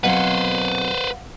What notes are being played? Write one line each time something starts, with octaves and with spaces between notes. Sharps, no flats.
B2 F#3 C4 B4 C5 F5 F#5